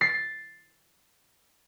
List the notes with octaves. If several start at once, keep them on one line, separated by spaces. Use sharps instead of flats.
A6 C7